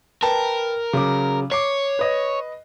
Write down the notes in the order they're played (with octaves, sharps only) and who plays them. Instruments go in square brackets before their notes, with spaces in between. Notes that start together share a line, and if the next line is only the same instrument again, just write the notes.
[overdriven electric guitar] A#4 [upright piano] B4 G5 A5
[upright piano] C#3 F#3 D6
[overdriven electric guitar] C#5 [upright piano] D6 C7
[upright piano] B4 D#5